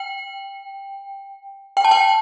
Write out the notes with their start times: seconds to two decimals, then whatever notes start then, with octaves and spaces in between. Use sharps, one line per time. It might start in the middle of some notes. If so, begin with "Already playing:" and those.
Already playing: G5
1.77 G5
1.84 A5
1.91 G5